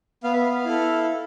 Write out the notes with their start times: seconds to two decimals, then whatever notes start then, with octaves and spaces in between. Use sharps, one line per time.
0.24 B3 F5
0.33 E5
0.42 F5
0.65 E4 A4